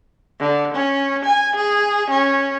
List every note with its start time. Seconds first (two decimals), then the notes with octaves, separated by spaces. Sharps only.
0.40 D3
0.74 C#4
1.25 G#5
1.56 G#4
2.10 C#4